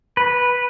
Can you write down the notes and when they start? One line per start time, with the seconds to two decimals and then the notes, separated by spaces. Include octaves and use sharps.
0.17 B4